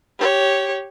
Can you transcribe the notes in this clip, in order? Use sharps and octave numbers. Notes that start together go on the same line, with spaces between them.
G4 C#5